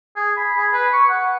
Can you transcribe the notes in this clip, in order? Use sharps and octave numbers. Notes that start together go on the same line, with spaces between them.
G#4
B5
G#4
B4
C#6
F#5